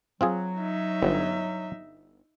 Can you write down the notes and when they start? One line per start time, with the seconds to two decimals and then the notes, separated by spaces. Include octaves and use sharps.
0.21 F#3 C4 F4 G#4
0.58 D#4 E5
1.02 G1